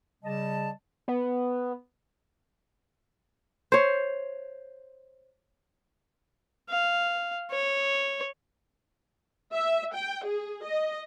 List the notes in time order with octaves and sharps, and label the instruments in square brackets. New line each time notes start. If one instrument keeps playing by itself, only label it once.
[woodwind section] C#3 G3 D#5 A5
[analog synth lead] B3
[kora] C5 C#5
[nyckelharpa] F5
C#5
[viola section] E5
G5
G#4
D#5